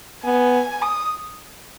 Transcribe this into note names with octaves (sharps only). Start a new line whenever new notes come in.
B3 G#5
D#6